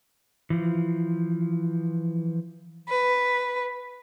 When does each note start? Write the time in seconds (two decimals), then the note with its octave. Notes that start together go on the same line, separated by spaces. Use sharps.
0.50 E3 F3
2.89 B4